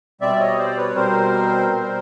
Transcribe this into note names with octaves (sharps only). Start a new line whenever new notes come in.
B2 G3 C4 D5 E5
C#5 D#5
C5 D5
B4 C#5
B2 G3 C4 A#4 C5
B2 G3 C4